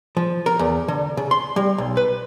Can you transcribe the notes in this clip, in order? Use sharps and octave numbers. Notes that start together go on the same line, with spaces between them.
F3
A#4
E2
D3
C#3
C6
G3
B1
B4